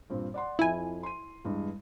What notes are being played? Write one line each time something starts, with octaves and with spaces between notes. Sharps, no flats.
G2 A#2 C4
D5 F#5 C6
F2 F3 E4 G#5
C6 D#7
E2 G2 G#3